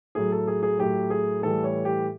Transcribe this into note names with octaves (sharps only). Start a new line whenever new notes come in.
A2 F#3 G#4
A4
G#4
G#4
A2 F#3 G4
G#4
A2 E3 G3 A4
C#5
G4